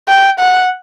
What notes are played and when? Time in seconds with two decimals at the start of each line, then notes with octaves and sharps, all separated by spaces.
0.08 G5
0.40 F#5